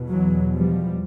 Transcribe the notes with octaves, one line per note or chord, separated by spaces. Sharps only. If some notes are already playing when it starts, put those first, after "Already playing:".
Already playing: E2 B2
E3 F#3
F3 G3